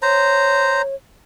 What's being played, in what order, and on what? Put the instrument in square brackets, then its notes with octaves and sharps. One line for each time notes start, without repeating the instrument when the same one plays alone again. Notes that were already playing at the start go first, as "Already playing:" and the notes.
[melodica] C5 A#5 [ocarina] C#5